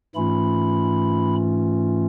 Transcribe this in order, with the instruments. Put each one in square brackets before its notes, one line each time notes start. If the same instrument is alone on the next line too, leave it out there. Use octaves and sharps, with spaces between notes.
[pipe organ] G#2 E3 A3 C#4 F4 B5